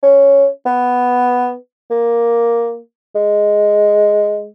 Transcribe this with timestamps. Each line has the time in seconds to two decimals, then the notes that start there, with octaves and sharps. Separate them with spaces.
0.03 C#4
0.66 B3
1.90 A#3
3.15 G#3